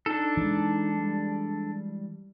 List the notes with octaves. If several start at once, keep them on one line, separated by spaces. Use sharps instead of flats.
D4 D#4 A4
E3 G#3
G3